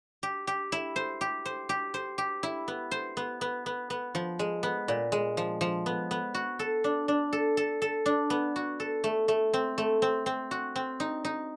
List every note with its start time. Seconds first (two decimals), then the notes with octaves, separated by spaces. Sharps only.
0.23 G4
0.47 G4
0.72 E4
0.96 C5
1.21 G4
1.46 C5
1.69 G4
1.94 C5
2.18 G4
2.43 E4
2.68 B3
2.91 C5
3.17 B3
3.41 B3
3.66 B3
3.90 B3
4.15 F3
4.39 G#3
4.63 B3
4.88 A#2
5.12 G#3
5.37 F3
5.61 F3
5.86 B3
6.11 B3
6.35 F#4
6.59 A4
6.84 D4
7.08 D4
7.33 A4
7.57 A4
7.82 A4
8.06 D4
8.30 B3
8.56 F#4
8.80 A4
9.04 A3
9.28 A3
9.54 C4
9.78 A3
10.02 C4
10.26 C4
10.51 F#4
10.76 C4
11.00 D#4
11.25 D#4